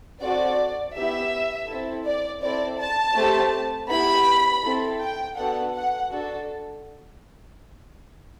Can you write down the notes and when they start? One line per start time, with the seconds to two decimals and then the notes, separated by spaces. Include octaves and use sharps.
0.21 C4 F#4 A4 D5
0.95 B3 E4 G4 E5
1.68 C4 E4 A4
2.05 D5
2.42 C4 E4 A4 D5
2.79 A5
3.16 A3 C4 G4
3.89 B3 E4 G4 B5
4.63 C4 E4 A4
5.00 G5
5.36 B3 D4 F#4 A4 F#5
5.74 F#5
6.10 D4 F#4 A4